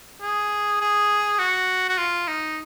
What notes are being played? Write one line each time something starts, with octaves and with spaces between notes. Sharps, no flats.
G#4
G#4
F#4
F#4
F4
D#4